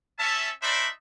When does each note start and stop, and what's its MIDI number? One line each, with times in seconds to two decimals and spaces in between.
0.19 0.50 61
0.19 0.50 76
0.19 0.50 81
0.63 0.88 62
0.63 0.88 63
0.63 0.88 72
0.63 0.88 74
0.63 0.88 76
0.63 0.88 83